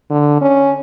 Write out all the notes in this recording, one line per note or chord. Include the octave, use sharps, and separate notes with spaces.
D3
C#4